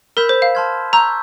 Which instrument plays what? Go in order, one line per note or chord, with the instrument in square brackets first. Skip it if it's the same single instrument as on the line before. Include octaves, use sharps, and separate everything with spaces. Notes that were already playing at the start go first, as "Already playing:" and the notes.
[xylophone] A#4 [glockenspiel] B5 E6 G6 B6 E7
[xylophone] C5
F5
[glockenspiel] A5 C6 F6 G#6
[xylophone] A#5 [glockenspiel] C#6 E6 G6